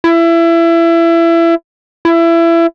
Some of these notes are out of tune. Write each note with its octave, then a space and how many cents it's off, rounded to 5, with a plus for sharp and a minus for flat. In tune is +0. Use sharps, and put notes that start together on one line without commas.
E4 +25
E4 +25